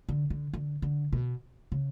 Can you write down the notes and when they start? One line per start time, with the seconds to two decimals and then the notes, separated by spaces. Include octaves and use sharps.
0.09 D3
0.30 D3
0.53 D3
0.82 D3
1.13 B2
1.72 C#3